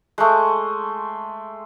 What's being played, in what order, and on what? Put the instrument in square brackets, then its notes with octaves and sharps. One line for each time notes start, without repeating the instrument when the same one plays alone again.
[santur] G#3 A3